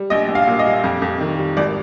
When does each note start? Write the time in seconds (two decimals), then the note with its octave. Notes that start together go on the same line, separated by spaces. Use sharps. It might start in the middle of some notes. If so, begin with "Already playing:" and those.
Already playing: G3
0.10 A#1 D#5
0.28 A#1
0.35 F5
0.48 A#2
0.59 D#5
0.66 G3
0.84 F2
1.02 F2
1.21 D#3
1.38 G3
1.57 G#1 D5